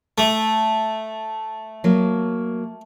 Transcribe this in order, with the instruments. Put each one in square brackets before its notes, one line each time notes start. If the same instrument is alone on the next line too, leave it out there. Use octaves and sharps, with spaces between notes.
[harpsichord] A3
[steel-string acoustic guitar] F#3 A#3